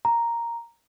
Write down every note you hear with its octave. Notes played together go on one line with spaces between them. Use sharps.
A#5